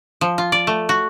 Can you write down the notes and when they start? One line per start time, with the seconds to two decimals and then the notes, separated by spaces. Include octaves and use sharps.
0.21 F3
0.38 F4
0.52 D5
0.67 A3
0.89 F#4